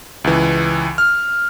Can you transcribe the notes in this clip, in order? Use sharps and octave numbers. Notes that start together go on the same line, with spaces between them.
C#2 E3
F6